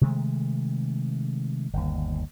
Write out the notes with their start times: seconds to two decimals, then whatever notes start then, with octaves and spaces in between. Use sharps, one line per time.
0.01 C3 D#3 G#3 A3
1.73 G1 D#2